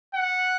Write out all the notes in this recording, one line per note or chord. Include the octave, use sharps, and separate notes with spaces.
F#5